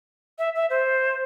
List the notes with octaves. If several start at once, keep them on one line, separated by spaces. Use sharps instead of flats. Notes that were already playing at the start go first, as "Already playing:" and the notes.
E5
E5
C5